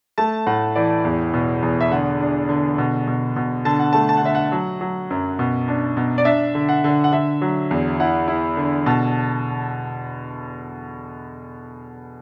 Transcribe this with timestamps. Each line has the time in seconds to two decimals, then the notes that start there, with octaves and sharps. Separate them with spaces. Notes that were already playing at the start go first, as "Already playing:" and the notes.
0.18 A3 A5
0.47 A2 F#5
0.75 E3 D5
1.05 E2
1.34 B2
1.62 E2
1.81 E5
1.91 D3 F#5
2.20 D4
2.49 D3
2.78 B2
3.07 B2
3.36 B2
3.65 D3 A5
3.79 F#5
3.93 A3 A5
4.09 A5
4.17 F#5
4.23 D3 E5
4.35 F#5
4.52 F#3
4.81 F#3
5.10 F#2
5.39 B2
5.68 D4
5.97 B2
6.18 D5
6.25 D4 E5
6.55 D3
6.69 F#5
6.84 D3
7.04 F#5
7.12 D3 E5
7.41 F#3
7.71 E2
8.00 E4 F#5
8.28 E4
8.57 D3
8.86 B2 A5